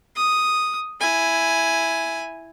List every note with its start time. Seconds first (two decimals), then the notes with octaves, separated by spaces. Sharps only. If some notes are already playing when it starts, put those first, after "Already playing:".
0.16 D#6
1.00 E4 G#5